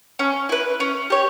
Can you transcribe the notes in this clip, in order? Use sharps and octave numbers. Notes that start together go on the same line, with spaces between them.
C#4
E4 B4
C#4
G4 C#5